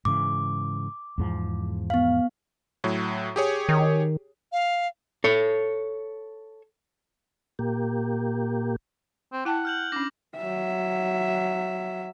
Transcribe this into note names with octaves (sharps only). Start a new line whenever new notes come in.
G#2 C#3 E3 D6
E2 G#2 F3
B3 F5
A2 F#3
G4 G#4 C#5
D#3
F5
A4 C#5
A#2 A#3 G4
C4
E4 F#5 G5 A5
F6 G6 F#7
C#4 D4 D6 A#6
F#3 E5